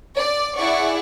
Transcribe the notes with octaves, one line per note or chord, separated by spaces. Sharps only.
D5
E4 G#4 D5 F#5 C#6